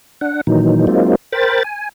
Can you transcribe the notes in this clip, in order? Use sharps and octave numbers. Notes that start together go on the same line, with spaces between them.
D4 F#5
A#2 D#3 E3 F#3 D#4
F#3 G#3 A#3 C4 D#4 F4
A#4 C5 G5 B5 A6
G#5